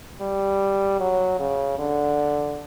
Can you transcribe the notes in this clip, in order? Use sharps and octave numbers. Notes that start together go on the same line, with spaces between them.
G3
F#3
C#3
D3